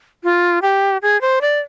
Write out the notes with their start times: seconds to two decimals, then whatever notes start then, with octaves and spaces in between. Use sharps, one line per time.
0.24 F4
0.62 G4
1.02 G#4
1.21 C5
1.41 D5